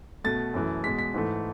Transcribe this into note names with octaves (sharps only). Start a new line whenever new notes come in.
B2 A3 A6
F#2 E3 A3
B2 G#3 B6
B6
G#2 E3 A3